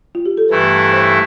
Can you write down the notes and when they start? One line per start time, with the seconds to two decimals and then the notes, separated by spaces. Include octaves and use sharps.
0.15 F4
0.26 G4
0.37 A4
0.49 G2 E3 A3 E4 B4
0.92 C5